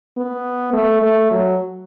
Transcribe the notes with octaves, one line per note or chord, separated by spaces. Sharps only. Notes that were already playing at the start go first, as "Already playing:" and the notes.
B3
A3
A3
F#3